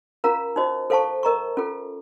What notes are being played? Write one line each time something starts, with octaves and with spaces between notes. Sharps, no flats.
C#4 F4 A#4 F5 A#5
D#4 F#4 C5 D#5
A4 C5 F5 A5 C#6
A#4 D#5 A#5 C#6
C#4 F4 A4